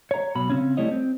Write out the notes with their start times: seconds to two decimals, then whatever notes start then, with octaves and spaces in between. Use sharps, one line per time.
0.11 C#5 A#5
0.35 B1 B2 B5
0.50 C#3 C4 C#4
0.77 G3 A3 E4 C#5 D#5
0.91 C4